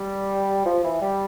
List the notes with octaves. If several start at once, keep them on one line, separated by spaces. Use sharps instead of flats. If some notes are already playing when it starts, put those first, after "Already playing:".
Already playing: G3
F3
E3
G3